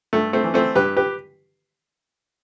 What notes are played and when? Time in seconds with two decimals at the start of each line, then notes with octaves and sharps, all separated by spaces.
0.13 G2 A3
0.33 A3 C4
0.44 E3
0.54 A3 C4
0.75 G2 G4 B4
0.97 G4 B4